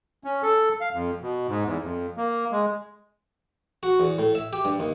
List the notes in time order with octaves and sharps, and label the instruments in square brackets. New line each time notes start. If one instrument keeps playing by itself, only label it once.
[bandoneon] C#4
A4
F5
F2
B2
G#2
E2
F2
A#3
G#3
[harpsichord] F#4
E2
A2
E5
G4
G2
D#2